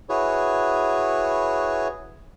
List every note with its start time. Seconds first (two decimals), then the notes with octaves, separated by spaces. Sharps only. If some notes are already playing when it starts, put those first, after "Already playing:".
0.09 E4 F#4 G#4 B4 C#5